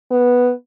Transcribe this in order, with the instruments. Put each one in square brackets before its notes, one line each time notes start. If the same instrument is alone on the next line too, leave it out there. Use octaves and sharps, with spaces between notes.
[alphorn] B3